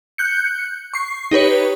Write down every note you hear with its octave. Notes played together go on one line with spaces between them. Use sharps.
F#6 G6 C#7
C#6 C7
D#4 G4 B4 C#5